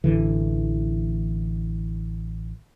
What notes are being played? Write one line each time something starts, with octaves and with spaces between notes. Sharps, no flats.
A1 D3 E3